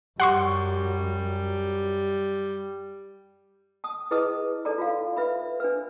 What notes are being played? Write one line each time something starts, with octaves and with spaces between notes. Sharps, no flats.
F#2 G3 F#5 C6 C#6
A5 D#6
E4 G#4 B4 D#5 A5 D#6
D#4 A4 D5 A5 A#5
F4 F#4 F5
B4 E5 B5
D4 B4